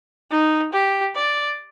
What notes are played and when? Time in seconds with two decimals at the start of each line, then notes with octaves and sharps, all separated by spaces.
0.31 D#4
0.73 G4
1.15 D5